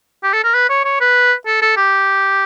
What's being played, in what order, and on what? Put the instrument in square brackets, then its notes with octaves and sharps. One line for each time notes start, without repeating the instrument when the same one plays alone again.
[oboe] G4
A4
A#4
B4
C#5
C#5
B4
A4
A4
G4